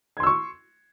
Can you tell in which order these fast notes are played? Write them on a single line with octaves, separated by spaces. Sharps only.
G#6 C6 E6 C#6